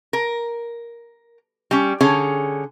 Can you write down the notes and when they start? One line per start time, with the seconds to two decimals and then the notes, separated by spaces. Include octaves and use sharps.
0.13 A#4
1.71 G3 C#4
2.01 D3 C#4 G#4 C#5